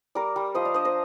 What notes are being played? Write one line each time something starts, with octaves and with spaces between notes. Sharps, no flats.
G3 A#4 D5
G3
F3 C5 D#5
D5 F5
D4 C5 D#5
C5 D#5